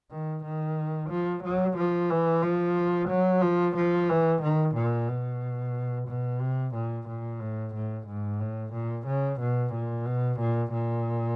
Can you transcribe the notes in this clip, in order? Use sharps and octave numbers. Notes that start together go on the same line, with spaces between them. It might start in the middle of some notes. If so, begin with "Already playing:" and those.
D#3
D#3
F3
F#3
F3
E3
F3
F#3
F3
F3
E3
D#3
A#2
B2
B2
C3
A#2
A#2
A2
A2
G#2
A2
A#2
C#3
B2
A#2
B2
A#2
A#2